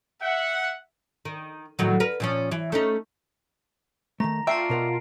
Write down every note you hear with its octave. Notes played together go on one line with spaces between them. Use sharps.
E5 F#5
D#3
A2 D#3 F#3
A#4 B4
A#2 F3 C#4
E3
A3 C#4 D#4
D#3 A3 A#5 A#6
A3 D4 F4 E5 G5 A5 C7 D7
B2 A#4 F#5